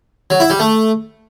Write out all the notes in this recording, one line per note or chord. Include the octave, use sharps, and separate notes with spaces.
F#3
E4
G3
A3